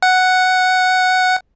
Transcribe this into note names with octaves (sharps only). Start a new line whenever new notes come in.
F#5